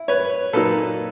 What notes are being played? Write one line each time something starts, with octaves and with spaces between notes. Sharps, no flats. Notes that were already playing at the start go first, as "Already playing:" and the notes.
Already playing: E4
B4 C#5
A#2 F#3 A#3 D#4 A4 B4